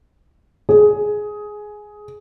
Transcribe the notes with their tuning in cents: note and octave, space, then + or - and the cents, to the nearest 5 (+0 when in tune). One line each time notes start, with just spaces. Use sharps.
G#4 +10